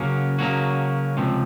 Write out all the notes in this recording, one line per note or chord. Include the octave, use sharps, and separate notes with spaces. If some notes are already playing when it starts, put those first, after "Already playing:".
Already playing: C#3 F#3 A#3 C#4 F#4
C#3 F#3 A#3 C#4 F#4
C#2 C3 F3